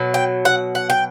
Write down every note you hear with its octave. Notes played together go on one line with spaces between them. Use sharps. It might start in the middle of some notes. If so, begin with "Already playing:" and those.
Already playing: B2 F#3
G5
F#5
F#5
G5